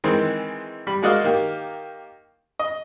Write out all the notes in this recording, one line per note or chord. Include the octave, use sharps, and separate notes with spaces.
D#3 E3 G#3 C4
G3 B5
G#3 A#3 F#4 D5 D#5 F5
D#3 A#3 G4
D#5